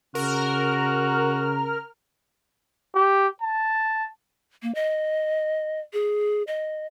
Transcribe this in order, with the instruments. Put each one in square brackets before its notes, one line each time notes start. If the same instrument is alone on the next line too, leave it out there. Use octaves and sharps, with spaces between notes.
[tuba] C#3 [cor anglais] F#4 [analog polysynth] A#4 F6
[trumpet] G4
A5
[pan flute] A#3
D#5
G#4
D#5